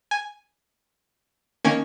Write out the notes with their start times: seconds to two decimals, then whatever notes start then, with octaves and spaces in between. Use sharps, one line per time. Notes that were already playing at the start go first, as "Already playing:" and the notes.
0.11 G#5
1.64 D#3 A#3 C#4 G#5